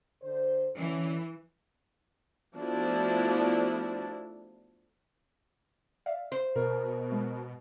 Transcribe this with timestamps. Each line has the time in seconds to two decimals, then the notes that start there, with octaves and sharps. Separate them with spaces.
0.23 D3 C5
0.76 D3 E3 C#4
2.56 F3 A3 B3 D4 E4 F#4
6.06 D5 E5 F5
6.32 C5
6.56 B2 A#4
7.12 G#3